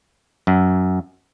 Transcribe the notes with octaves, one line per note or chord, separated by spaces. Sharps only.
F#2